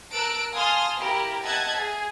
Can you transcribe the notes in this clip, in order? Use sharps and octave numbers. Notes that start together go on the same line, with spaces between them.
A#4 A5 E6 F#6 D7
F5 G#5 A5 C6 D#6 F6
E4 G4 A#4
D#5 E5 F#5 A5 F#6 G#6
G#4